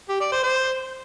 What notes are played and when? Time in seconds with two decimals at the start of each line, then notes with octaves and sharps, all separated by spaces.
0.09 G4
0.20 D5
0.32 C5
0.43 C5